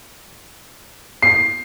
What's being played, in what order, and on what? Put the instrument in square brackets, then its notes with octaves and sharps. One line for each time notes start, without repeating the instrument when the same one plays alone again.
[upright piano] C7